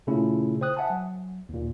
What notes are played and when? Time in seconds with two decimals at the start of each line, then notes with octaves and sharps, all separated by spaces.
0.07 A#2 C#3 A3 C#4 E4 F4
0.61 C5 G5 D#6 F#6
0.77 E5 F#5 G#5 A5
0.90 F#3
1.49 D#2 A#2